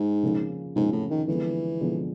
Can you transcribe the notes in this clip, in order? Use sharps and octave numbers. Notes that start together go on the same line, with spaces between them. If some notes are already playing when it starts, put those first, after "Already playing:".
Already playing: G#2
C#3 F3 A#3 C#4 F4
G#2 C#3 F3 A#3 C#4 F4
A2
D#3
D3 E3 F3 G#3 B3
D3 F3 G#3 B3